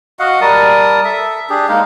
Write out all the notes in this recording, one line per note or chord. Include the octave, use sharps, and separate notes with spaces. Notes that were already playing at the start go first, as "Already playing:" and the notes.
F#4 D#5 F5 F#5
G3 A#4 A5 D#6
A4 E5
D4 G4 G#4
G#3 A#3 D#4 F5